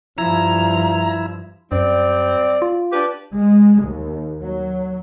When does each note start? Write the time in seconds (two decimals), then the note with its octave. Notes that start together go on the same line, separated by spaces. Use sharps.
0.18 G2 F3 E4 A#5
1.72 F#2 G3 C4 D5
2.62 F4
2.92 D4 G4 B4
3.33 G#3
3.86 D#2
4.42 F#3